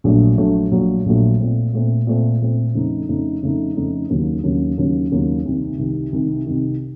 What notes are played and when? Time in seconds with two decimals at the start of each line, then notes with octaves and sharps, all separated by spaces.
0.04 A#1 A#2 F#3 A3
0.38 A#1 A#2 F#3 A3
0.72 A#1 A#2 F#3 A3
1.06 A#1 A#2 F#3 A3
1.39 A#2 A3 C4
1.73 A#2 A3 C4
2.07 A#2 A3 C4
2.41 A#2 A3 C4
2.75 F2 C#3 A3 D#4
3.09 F2 C#3 A3 D#4
3.43 F2 C#3 A3 D#4
3.76 F2 C#3 A3 D#4
4.10 D#2 C#3 F#3 A#3 C#4
4.44 D#2 C#3 F#3 A#3 C#4
4.78 D#2 C#3 F#3 A#3 C#4
5.12 D#2 C#3 F#3 A#3 C#4
5.45 C2 C3 D#3
5.78 C2 C3 D#3
6.12 C2 C3 D#3
6.46 C2 C3 D#3